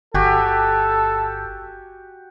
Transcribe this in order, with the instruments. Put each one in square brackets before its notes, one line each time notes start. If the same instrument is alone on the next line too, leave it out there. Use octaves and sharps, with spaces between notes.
[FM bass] G1 [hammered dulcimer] F#4 G4 G#5 [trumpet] A4